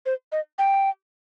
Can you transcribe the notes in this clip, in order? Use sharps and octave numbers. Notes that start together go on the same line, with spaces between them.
C5
D#5
G5